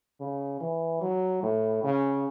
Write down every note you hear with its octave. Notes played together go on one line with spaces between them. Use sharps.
C#3
E3
F#3
A2
C#3